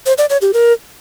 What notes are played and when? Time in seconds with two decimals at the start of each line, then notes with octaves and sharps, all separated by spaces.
0.06 C5
0.18 D5
0.30 C#5
0.42 G4
0.53 A#4